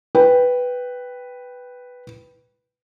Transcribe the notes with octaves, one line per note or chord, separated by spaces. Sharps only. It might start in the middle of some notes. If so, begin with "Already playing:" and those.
B4 G5